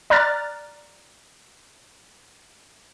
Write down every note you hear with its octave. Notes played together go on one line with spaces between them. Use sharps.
D5 A#5 F6 F#6 A6